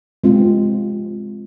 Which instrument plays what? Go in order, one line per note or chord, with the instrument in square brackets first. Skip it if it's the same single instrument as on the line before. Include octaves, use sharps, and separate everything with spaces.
[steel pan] G#3 C4 F4